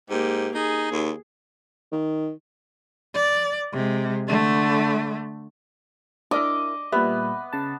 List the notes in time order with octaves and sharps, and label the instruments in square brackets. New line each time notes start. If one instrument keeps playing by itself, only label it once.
[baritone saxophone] G#2 [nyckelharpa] A#3 G4
[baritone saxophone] D#4 [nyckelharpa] G#4
[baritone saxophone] D#2
[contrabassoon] D#3
[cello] D5
C3 G#3
D3 A3
[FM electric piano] D4 [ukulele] E4 A#4 D5 [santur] D#5 [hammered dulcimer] D6
[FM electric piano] A#2 G3 [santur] B3 [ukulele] E5
[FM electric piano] C#3 A5